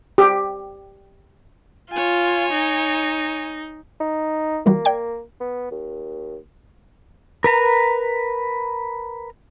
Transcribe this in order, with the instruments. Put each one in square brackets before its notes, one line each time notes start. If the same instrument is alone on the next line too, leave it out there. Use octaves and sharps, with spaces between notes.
[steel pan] G4
[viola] F4 [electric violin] C#5 G#5
[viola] D#4
[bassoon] D#4
[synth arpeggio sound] E3 G3 F#4 [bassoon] A#3
[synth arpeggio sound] D5 G5 G#6
[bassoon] B3
D#2
[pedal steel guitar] A#4 B4 A#5